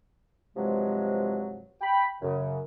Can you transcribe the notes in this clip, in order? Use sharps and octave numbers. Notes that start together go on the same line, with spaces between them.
G2 C3 F3 F#3 G#3
G5 B5
F#2 C#3